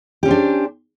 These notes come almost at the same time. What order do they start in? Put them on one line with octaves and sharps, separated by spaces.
G4 C#4 C5 D4